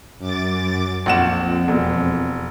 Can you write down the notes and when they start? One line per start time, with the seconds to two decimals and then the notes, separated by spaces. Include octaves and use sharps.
0.19 F#2 D6 A6
1.06 A#1 F2 F#5 E7
1.68 E1